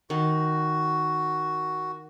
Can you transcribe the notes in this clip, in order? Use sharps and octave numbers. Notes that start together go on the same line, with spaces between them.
D#3 F#4